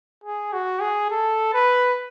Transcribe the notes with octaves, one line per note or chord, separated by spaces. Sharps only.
G#4
F#4
G#4
A4
B4